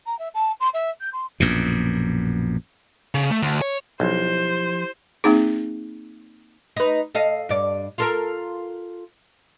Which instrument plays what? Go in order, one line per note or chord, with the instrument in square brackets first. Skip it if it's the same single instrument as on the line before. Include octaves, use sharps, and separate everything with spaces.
[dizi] A#5
E5
A5
C6
E5
G6
C6
[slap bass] A#1 F#2 B2
[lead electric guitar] C#3
A3
D2
C#5
[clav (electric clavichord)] B1 [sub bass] F3 [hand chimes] E4 G4 [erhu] C5
[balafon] A#3 C4 D#4 G#4
[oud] D#4 B4
A4 D#5 F5
G2 D5
F4 A4 A#4